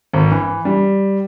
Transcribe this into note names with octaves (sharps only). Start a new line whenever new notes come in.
G#1
E3
G3